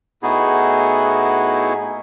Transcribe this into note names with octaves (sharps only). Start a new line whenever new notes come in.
A2 B3 D#4 E4 F#4 G#4